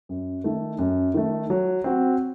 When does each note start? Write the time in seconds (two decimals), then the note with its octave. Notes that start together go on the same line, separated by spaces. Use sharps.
0.09 F#2
0.44 D#3 A3
0.78 F#2
1.14 D#3 A3
1.50 F#3
1.84 C4 F#4